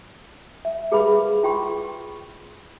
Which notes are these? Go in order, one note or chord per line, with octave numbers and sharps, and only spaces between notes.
E5
G4 G#4 A#4 B4 F5 B5
F4 G5 C6 C#6